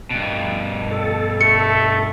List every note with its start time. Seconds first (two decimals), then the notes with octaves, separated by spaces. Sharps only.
0.11 G2 B2
0.91 A4
1.41 A3 C#7